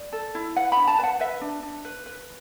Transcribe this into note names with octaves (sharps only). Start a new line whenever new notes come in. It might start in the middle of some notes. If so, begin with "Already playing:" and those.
Already playing: D5
A4
E4
B4 F#5
D4 B5
A5
B4 A5
F#5
B4 E5
D4
D4
B4
B4